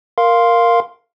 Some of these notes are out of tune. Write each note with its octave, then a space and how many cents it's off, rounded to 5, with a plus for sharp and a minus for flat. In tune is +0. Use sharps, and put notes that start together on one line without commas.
A#4 +0 F5 +0 C6 +0